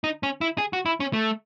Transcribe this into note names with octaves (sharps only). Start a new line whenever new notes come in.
D#4
C#4
E4
G#4
F#4
E4
C#4
A3